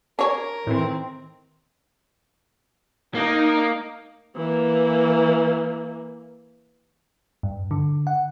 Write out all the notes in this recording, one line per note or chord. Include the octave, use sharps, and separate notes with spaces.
D4 A#4 C#5 G#5 G#6
A2 D#3 E3 C4
A#3 D#4
E3 A#3
G2
D3
F#5